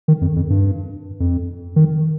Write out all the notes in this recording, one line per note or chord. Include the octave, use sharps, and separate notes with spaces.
D#3
F2
F2
G2
F2
D#3